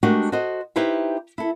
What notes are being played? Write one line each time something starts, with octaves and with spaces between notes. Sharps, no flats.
G#3 A3 D4 F#4 G4 A#4
F#4 A4 C5 D#5
D#4 E4 G4 B4 C5 E5
E4 A4